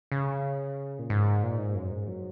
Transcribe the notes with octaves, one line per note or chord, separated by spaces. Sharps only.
C#3
A#2
G#2
A#2
G#2
F#2
G#2
F#3